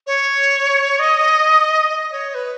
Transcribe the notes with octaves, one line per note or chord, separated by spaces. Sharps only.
C#5
D#5
D#5
C#5
B4